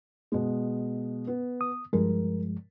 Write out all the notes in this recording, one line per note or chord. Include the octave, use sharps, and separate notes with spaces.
B2 G#3
B3
D#6
G2 F3 G#3 A#4